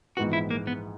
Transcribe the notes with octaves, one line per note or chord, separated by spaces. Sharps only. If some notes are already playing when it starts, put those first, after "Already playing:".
A#1 G#2 E3 G#3 B3 F#4
E4
A#3
B3